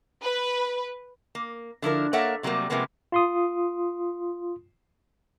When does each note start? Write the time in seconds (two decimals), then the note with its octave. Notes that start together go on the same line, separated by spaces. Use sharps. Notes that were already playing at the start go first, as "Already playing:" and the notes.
0.23 B4
1.35 A#3
1.82 D3 F3 E4 A#4
2.13 A#3 A4 A#4 C#5 E5 F#5
2.43 C3 F#3 G3 A3 A#3
2.70 C3 F3 G#3 A#3 B3
3.12 F4 C6 D#6